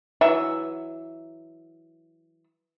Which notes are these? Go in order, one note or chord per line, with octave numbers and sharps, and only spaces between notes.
E3 F#3 E5